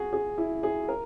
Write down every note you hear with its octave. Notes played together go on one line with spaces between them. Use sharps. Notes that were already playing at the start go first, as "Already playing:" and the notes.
Already playing: F#4 G#4
G#4
E4
G#4
A#4